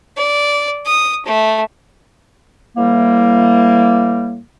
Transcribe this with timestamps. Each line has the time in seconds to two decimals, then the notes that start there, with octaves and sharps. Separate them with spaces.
0.16 D5
0.86 D#6
1.25 A3
2.77 A2 E3 G3 A#3